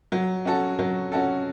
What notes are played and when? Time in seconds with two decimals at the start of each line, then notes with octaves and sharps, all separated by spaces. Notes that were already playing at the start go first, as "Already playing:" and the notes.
0.12 F#3
0.45 C#4 F#4 A4
0.79 F#3
1.12 C#4 F#4 A4